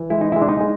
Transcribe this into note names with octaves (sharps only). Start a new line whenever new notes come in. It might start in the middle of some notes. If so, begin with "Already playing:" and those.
Already playing: E3
G#3 E4
D#4
G#3 E4
D4
D#4
G#3